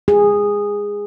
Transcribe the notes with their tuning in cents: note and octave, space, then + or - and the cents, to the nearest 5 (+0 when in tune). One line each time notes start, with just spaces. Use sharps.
G#4 -15